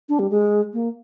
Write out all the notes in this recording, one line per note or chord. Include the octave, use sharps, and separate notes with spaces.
D4
G3
G#3
A#3